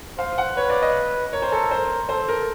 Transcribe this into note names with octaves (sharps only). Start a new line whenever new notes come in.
C5 F5
F#5
B4 C#5
D5
D#5
A#4 C#5
C5
A4
C5
A4 C5
A#4